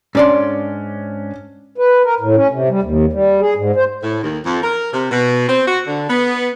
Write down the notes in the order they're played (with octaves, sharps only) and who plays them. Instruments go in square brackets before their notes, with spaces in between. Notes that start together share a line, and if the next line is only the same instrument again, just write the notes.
[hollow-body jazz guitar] G#2 D5 C6 [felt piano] C#4 D4
[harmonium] B4
A#4
A2
C#4
C3
G3
D#2
G3
G#4
G#2
C5
[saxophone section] A2
D#2
F2
A#4
C3
B2
C4
F#4
D3
B3